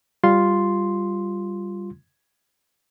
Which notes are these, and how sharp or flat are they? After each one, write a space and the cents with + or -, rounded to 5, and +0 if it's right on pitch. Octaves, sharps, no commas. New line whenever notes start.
G3 +0 F4 +0 C6 +0